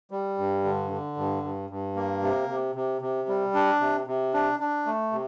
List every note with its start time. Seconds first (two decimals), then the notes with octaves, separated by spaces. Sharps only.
0.11 G3
0.38 G2
0.64 D3
0.91 D3
1.17 G2
1.43 G2
1.70 G2
1.96 A#3
2.22 C3
2.49 C3
2.75 C3
3.02 C3
3.28 G3
3.54 D4
3.80 C3
4.07 C3
4.34 D4
4.60 D4
4.86 A3
5.12 C3